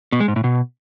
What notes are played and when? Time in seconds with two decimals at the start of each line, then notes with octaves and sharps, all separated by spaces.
0.12 B2
0.20 G#3
0.28 G#2
0.36 A2
0.44 B2